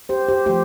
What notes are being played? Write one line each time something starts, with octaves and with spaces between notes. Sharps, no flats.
G4 C5
G4 C5
F3 A3 G4 C5